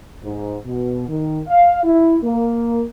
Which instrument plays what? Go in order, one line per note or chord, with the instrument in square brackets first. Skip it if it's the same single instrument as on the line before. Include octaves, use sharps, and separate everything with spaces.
[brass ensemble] G#2
B2
D#3
F5
E4
A#3